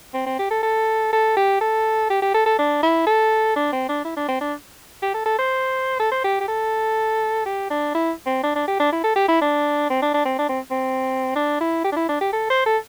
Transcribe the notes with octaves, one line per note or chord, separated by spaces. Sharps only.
C4
C4
G4
A4
A4
A4
G4
A4
G4
G4
A4
A4
D4
E4
A4
D4
C4
D4
E4
D4
C4
D4
G4
A4
A4
C5
A4
C5
G4
G4
A4
G4
D4
E4
C4
D4
D4
G4
D4
E4
A4
G4
E4
D4
C4
D4
D4
C4
D4
C4
C4
D4
E4
G4
D4
E4
D4
G4
A4
C5
A4